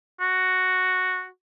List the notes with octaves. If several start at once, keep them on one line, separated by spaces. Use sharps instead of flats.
F#4